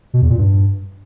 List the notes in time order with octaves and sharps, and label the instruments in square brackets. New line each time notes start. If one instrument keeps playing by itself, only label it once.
[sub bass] B2
E2
A#2
G2